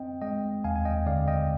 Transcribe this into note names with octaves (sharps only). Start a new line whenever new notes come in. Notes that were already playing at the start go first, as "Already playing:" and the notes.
Already playing: C4 D#5 G5
G#3 D#5 G5
D#2 F5 G#5
G#5
D#5 G5
D3 D5 F5
D#5 G5